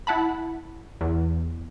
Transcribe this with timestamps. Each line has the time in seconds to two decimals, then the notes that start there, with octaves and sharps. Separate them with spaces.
0.07 E4 F#5 A5 B5
1.01 E2